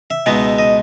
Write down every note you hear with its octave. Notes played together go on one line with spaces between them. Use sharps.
E5
C#2 B2 G#3 B3 D#4
D#5